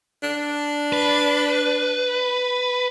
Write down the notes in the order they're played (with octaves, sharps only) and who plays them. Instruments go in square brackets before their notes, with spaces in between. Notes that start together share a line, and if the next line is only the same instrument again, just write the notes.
[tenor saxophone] D4
[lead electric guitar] B4